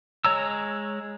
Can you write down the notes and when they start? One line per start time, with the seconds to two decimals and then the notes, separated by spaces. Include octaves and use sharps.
0.25 G#3 C#5 A#5 E6